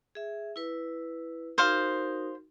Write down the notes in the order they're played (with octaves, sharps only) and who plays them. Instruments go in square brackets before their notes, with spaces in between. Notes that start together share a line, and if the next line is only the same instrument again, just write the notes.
[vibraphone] G#4 E5
E4 B4
[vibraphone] D#4 F#4 A#4 [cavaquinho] C5 F5